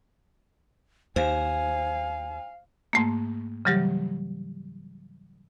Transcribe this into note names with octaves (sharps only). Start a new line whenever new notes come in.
D#2 C5 F5 G#5
G#2 A3 A#3
C#3 E3 F#3 G3 G4